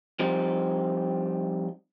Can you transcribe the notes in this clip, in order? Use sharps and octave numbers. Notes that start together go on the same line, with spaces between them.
F3 G3 C4 D#4